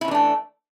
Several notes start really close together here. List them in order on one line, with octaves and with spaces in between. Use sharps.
E4 C#4 E3 D4 A3